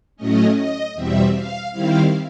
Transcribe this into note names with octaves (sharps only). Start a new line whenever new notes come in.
A2 F#3 A3 C#4 D#5
D#5
E2 B2 G3 C4 E5
F5
D#3 G3 C4 E4 F5